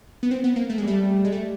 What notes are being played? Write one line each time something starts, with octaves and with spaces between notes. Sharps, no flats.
B3
C4
B3
A#3
A3
G3 G#3
A3
G#3
A3